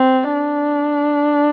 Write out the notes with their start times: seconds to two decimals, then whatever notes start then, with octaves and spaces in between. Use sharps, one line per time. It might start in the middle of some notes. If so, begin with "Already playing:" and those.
Already playing: C4
0.34 D4